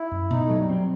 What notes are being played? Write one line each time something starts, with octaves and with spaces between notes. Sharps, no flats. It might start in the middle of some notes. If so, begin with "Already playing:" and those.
Already playing: E4
F#2
B2 D#4
F#3 A3
G3
C4